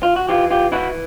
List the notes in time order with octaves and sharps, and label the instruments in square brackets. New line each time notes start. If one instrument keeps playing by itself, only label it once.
[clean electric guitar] F4
F#4
E3 F4 G4
F4 G4
E3 E4 F#4